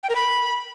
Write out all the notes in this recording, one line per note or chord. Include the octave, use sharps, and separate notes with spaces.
G5
A#4
B5